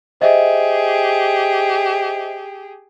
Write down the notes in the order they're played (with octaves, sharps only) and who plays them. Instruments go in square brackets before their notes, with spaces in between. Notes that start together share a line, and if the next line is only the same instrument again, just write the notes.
[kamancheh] G4 G#4 [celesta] C5 D#5 E5